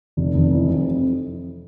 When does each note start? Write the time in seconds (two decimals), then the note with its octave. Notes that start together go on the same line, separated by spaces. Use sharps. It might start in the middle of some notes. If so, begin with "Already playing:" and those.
0.17 F1
0.34 F1
0.53 E3
0.69 F2